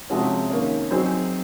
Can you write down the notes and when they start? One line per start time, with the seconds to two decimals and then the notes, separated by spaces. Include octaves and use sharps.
0.10 C3 F3 G#3 C#4 F#4
0.50 D#3 A#3 C#4
0.91 F#3 C4 D#4 G#4